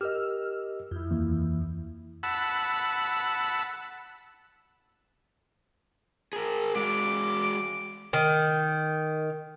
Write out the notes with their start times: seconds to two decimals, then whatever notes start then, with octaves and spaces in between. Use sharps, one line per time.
0.01 G4 A#4 D#5 E6 F6
0.91 F2 E4
1.11 D#2 E3 A#3
2.23 F#5 A5 B5 E6
6.33 G#4 A#4
6.75 G#3 F#4 D6
8.13 D#3